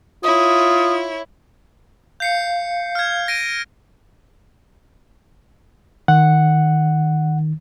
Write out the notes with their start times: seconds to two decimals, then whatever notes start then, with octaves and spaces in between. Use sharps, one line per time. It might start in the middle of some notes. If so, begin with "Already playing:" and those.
0.23 E4 F4 C#5 D#6
2.20 F5 G6 C7 C#7
2.95 F6 G#6
3.28 A#6 D7 D#7
6.08 D#3 F#5